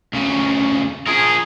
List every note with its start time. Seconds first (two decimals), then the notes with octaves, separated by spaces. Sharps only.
0.13 D2 C#3
1.07 F3 G#4 A#4